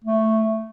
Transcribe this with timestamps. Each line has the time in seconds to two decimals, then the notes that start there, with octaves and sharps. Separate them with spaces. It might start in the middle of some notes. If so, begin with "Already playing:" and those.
0.04 A3